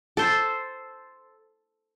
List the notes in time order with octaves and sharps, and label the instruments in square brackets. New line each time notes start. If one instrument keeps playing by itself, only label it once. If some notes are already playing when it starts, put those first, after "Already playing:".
[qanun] A4 C5